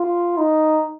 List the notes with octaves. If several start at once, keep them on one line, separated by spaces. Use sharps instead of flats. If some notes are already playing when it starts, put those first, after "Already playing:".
Already playing: F4
D#4